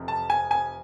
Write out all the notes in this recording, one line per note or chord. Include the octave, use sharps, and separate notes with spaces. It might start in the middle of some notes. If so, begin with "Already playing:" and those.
Already playing: F1 F2 F3
A5
G#5
G#5